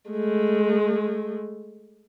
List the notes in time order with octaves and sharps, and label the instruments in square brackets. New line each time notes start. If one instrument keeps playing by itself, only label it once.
[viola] G#3 A3